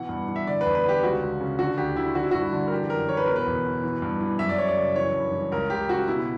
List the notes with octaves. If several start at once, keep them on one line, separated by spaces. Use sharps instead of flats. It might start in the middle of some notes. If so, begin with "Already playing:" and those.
Already playing: B2 E3 F#5
G2
E3
E5
D3 D5
E2 B4
B4
D3 G4
C#2 F#4
C#2
C#3
D3 F#4
D2 G4
D3 E4
D3 F#4
E4
G2 F#4
D3
A#4
E3 G4
F#2 A#4
E3 C#5
B4
B2 A#4
B4
E2
B2
E3
G2
E3
F#2 E5
D5
F#2 C#5
D5
C#3
E3 C#5
G2
E3
C#2 A#4
C#2 G4
C#3 F#4
B2 E4